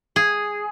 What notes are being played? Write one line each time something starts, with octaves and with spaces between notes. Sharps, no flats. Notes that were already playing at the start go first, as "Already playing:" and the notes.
G#4